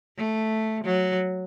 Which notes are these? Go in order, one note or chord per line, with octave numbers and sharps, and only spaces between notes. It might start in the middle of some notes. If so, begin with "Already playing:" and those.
A3
F#3